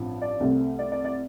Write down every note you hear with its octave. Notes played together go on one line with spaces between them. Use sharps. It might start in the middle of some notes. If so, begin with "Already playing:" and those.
Already playing: A1 G2 F3 C4
D5
C2 C3 A3 C4
D5
D5
D5